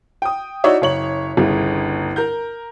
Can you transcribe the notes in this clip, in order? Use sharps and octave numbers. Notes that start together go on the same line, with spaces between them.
G5 D#6
D#4 E4 F#4 C#5 D5 E5
F#1 C#5 F#7
G1 C2 C#3
A#4 A#5 G6